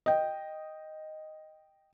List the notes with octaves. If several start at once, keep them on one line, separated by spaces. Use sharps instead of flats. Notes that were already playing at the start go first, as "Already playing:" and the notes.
D#5 G5